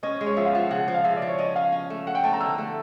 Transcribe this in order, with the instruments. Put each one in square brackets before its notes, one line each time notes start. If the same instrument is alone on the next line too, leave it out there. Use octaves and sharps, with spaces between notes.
[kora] C#4 [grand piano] D#5
[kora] G#3
[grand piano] C#5
[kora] F3 [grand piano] E5
[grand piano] F5
[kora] F3 [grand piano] F#5
[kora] C#3 [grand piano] F#5
[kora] F3
[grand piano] F5
[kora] C#3 [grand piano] E5
[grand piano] D5
[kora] F3
[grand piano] C#5
[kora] C#4 [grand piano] D#5
[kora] C#4 [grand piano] F5
[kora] C#4
A3
[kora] A3 [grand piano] F#5
[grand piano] G5
[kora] A3 [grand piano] A5
[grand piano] A#5
[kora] D3 [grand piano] E6
[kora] A3